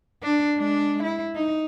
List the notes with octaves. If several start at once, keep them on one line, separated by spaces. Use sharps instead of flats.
D4
G#3 D4
E4
D#4